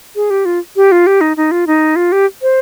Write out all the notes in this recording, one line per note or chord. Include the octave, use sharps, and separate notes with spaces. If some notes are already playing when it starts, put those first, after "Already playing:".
G#4
G4
F4
G4
F4
G4
D#4
D#4
F4
D#4
F4
G4
C5